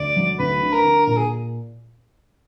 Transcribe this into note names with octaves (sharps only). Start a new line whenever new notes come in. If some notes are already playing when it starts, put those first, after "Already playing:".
Already playing: D2 D5
F#3
D2 B4
D3
A#4
D3
A#2 A#4
G#4